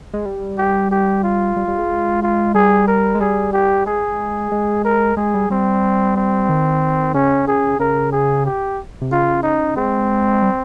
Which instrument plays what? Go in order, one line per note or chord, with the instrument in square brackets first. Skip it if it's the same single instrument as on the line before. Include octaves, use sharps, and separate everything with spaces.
[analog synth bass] G#3
G3
[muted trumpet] G4
G4
F4
[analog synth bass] G3
G3
G#3
[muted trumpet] F4
[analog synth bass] G3 [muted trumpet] G#4
[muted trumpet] A#4
[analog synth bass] G#3
[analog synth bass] G3 [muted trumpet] G#4
[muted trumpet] G4
[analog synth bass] G#3 [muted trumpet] G#4
[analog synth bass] G#3
[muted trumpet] A#4
[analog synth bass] G#3 [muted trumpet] G#4
[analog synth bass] G3
[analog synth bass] G3 [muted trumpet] C4
[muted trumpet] C4
[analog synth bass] D#3
[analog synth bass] C#3 [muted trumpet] C#4
[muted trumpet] G#4
[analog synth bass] C#3 [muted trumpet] A#4
[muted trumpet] G#4
G4
[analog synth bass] C3
[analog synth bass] C#3 [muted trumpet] F4
[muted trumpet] D#4
[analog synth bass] G#3 [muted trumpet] C4
[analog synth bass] G3